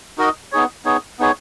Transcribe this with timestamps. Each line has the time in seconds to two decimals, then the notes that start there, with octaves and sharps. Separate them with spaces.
0.18 D#4 F#4 A#4 D#5
0.52 B3 D#4 G#4 C#5
0.85 B3 D#4 G#4 C#5
1.19 B3 D#4 G#4 C#5